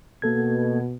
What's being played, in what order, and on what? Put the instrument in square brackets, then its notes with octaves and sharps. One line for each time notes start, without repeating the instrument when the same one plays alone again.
[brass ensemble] B2 [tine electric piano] A#3 A4 G#6